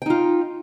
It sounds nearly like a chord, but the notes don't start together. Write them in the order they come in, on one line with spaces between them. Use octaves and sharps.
G5 D#4 F4